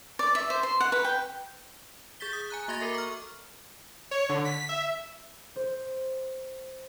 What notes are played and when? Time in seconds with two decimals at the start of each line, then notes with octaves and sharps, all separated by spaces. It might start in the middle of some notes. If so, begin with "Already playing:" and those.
0.19 D5
0.35 E5
0.50 C5
0.63 C6
0.80 F#5
0.92 B4
1.04 G5
2.20 G#4 G6 A6 B6 G7
2.33 D#6
2.50 G#5 A#5 F#6
2.68 A#3 F#4 E5 C6 G#6 A#6
2.81 A4 A#4 A#5 D6
2.94 C#6 F6
4.11 C#5
4.29 D3
4.45 B6
4.69 E5
5.56 C5